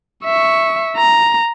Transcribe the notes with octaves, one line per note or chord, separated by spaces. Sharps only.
E5 C#6
A#5